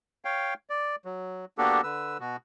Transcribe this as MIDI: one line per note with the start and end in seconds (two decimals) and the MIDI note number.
0.25 0.54 73
0.25 0.54 77
0.25 0.54 79
0.70 0.96 74
1.05 1.45 54
1.58 1.81 58
1.58 1.81 59
1.58 1.81 62
1.58 1.81 66
1.58 1.81 67
1.58 1.81 69
1.83 2.17 50
1.83 2.17 71
1.83 2.17 88
2.20 2.37 47
2.20 2.37 66